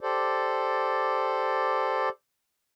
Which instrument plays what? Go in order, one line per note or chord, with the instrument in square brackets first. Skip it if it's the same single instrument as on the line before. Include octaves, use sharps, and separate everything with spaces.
[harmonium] G4 A4 C5 D5